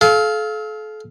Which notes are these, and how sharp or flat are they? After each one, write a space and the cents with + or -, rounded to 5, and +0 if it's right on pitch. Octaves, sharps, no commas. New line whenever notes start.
A4 -40 F5 +0